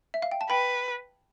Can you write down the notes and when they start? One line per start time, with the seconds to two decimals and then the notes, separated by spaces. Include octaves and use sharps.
0.14 E5
0.22 F5
0.32 G5
0.41 A5
0.50 B4 G5 B5